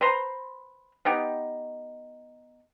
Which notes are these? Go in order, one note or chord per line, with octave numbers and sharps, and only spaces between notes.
B4 C5 A#5 C6
B3 D#4 G4